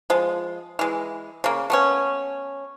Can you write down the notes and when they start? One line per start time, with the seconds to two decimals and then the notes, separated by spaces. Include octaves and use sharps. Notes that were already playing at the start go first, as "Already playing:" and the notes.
0.10 F3 G#3
0.79 E3 G#3
1.44 C#3 A#3
1.70 A3 B3 C#4